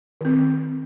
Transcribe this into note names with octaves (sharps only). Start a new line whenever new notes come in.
D#3 C4